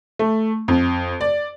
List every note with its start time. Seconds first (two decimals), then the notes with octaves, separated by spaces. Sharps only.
0.19 A3
0.68 F2
1.21 D5